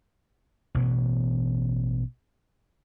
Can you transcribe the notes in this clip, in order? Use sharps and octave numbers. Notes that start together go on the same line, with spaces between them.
A1 B2 E3 B3